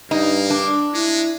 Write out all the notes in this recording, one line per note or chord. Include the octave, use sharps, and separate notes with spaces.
G2 A#3 D#4
D4
G#3 E4